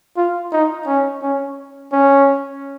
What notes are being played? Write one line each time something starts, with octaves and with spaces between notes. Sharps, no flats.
F4
D#4
C#4
C#4
C#4